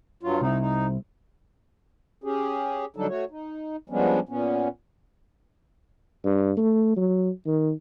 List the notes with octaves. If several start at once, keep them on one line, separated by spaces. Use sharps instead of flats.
G2 F#3 F4
C2 C4 D#4 E4
D#4
C#4 G4 G#4
D3 F#3 G3 D4 D#4 A4
A3 F#4 C#5
D#4
F3 G3 G#3 B3 C#4 D4
A#2 B3 C#4
G2
A3
F#3
D#3